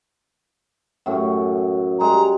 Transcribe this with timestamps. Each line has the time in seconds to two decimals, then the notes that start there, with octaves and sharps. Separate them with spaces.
1.06 F#2 A2 C#4
2.00 G3 G#3 A#5